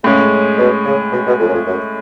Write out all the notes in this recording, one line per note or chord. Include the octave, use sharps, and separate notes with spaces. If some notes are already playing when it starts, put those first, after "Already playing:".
A2 C#3 G#3 C#4
B2
C#3
B2
B2
F2
F#2
F2
F#2